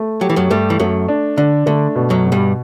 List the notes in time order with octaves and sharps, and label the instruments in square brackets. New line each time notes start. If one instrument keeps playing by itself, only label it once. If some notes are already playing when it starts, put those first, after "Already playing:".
Already playing: [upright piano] A3
[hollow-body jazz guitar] F#3 [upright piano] G4
[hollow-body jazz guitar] E3
F#2 F#3
[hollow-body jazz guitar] G2 G3 [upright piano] A3
[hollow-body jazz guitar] E3
[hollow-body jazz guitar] F#2 F#3 [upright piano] A3
[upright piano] D4
[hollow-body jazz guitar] D3 [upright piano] D4
[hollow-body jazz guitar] D3 [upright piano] A3
[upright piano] B2
[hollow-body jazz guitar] F#2 F#3
[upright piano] B2
[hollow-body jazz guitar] G2 G3